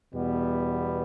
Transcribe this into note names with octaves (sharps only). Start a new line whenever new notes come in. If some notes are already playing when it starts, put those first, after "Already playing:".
E2 B2 G3 B3